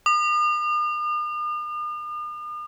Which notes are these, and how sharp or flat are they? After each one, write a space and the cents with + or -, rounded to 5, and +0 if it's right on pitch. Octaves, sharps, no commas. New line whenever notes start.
D#6 -45